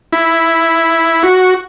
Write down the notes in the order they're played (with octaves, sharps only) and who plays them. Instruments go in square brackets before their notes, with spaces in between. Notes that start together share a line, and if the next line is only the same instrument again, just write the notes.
[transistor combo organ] E4
F#4